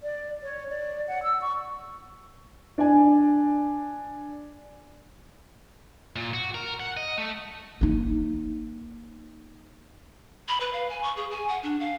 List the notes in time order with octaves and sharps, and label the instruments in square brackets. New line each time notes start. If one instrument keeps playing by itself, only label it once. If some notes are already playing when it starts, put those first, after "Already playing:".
[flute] D5
C#5
D5
F#5
E6
C#6
[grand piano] D4 D5 G#5
[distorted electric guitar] A#2
F#4
A#4
F#5
D#5
A3
[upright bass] A#3 D#4
[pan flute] B5
B4
F5
G#5
C#6
G#4
G#5
F#5
D4
F5